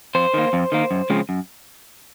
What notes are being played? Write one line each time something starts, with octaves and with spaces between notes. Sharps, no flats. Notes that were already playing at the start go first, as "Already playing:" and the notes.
F2 C5
D#3 A#3
F2
D#3 A#3
F#2
C#3 F3 G#3 C4
F#2